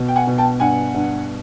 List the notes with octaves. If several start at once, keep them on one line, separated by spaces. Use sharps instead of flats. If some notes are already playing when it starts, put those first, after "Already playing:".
Already playing: B2
G5
F#5 G#5
B2
G5 A5
G2 F#5 G#5
G2